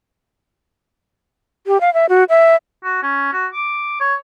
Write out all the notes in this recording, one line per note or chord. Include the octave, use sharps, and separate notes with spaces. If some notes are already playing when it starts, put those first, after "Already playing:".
G4
F5
E5
F#4
E5
F#4
C#4
F#4
D6
C#5